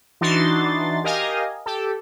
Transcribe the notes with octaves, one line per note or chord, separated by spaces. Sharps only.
E3 D4 D#4 F#4 C6 A6
G4 A#4 D#5 F5 G#5
G4 A4